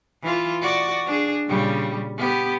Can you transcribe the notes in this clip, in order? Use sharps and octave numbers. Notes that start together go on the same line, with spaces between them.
E3 F4
F#4 D5
D4 G#4
A#2 C#3 G3
B3 G4